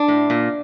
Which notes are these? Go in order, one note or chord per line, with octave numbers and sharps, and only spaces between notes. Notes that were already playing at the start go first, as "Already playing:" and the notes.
Already playing: D4
A2
A#2